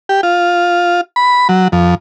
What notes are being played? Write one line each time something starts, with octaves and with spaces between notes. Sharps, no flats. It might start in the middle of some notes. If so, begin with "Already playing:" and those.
G4
F4
B5
F#3
F2